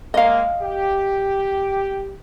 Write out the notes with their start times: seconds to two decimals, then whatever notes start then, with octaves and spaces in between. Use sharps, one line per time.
0.14 G#3 A#3 D#5 F5
0.62 G4